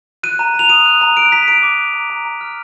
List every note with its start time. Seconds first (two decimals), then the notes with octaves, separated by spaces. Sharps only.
0.23 F#6 D#7
0.39 A#5
0.54 A#5
0.59 F7
0.69 D#6 D#7
0.85 F#6
1.01 A#5
1.16 F#6 D7
1.32 A#5 B6
1.42 D#7
1.48 A#5 D7
1.63 D6
1.79 F#6
1.94 A#5
2.10 A#5
2.25 A#5
2.41 F6